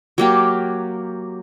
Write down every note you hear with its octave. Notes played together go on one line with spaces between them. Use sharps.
F#3 A#3 G4